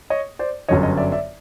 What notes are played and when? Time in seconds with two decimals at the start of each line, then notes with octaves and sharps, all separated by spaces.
0.10 C#5 D#5
0.39 C5 D5
0.68 G1 F#2 D3 C#5 D#5
0.83 C#5 D#5
0.97 D5 E5
1.12 D5 E5